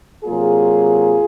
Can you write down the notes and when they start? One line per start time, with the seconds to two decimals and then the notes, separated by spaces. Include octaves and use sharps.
0.25 C3 F#3 A#3 F4 G#4